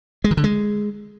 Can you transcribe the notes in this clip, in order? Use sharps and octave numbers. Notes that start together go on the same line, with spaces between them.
G#3
D#3
D3
G#3